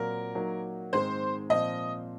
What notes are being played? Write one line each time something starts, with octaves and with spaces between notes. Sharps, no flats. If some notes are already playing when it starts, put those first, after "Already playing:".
Already playing: A#2 F#3 C4 F4 A#4
F#3 A#3 D#4
G#2 D#3 G#3 C4 C5
A#2 F3 C4 D#5